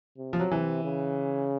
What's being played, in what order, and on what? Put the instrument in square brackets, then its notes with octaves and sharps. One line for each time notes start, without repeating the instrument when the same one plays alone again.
[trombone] C3
[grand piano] F3
F#3
[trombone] C3 [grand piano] E3
[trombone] C#3